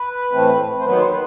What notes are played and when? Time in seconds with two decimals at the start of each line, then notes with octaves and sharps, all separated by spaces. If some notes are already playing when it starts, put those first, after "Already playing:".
Already playing: B4
0.32 A2 E3 A3 C4
0.80 C5
0.85 D#2 D#3 F#3 B3 B4
0.98 C5
1.11 B4